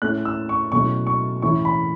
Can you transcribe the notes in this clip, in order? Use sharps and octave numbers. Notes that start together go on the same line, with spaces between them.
A2 A3 C#4 E4 F#6
E6
C#6
B2 F#3 A3 C#4 E4 C#6
C#6
A2 E3 C#4 E4 C#6
B5